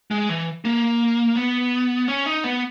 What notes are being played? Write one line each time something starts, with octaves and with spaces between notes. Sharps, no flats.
G#3
E3
A#3
B3
C#4
D#4
B3